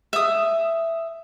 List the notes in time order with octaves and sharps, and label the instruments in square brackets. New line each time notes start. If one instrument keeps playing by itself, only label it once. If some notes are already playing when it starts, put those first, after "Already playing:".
[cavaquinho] E5 D#6